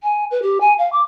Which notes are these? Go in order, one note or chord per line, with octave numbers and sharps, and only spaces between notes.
G#5
B4
G4
G#5
F5
D6